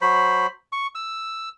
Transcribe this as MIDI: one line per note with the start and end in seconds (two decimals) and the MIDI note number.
0.01 0.47 54
0.01 0.47 72
0.01 0.47 83
0.72 0.87 85
0.95 1.49 88